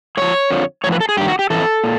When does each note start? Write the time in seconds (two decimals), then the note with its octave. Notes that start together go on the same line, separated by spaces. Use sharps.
0.17 A2 F3 C#5
0.50 F2 D3 F3
0.84 A2 C#5
0.87 F3
0.92 B4
1.00 A4
1.09 G#4
1.17 G2 G4
1.21 D#3
1.28 F#4
1.39 G4
1.50 F2 C3 E3 A4
1.84 A#2